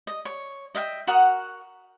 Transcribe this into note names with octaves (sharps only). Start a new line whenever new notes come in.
D#5
C#5
D#5 E5 F#5 G5
F#4 A#4 F#5 D#6